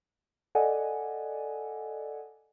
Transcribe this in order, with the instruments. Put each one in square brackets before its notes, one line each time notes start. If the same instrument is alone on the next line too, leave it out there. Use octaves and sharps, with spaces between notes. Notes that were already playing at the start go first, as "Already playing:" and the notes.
[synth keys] A4 D5 D#5 F#5 G#5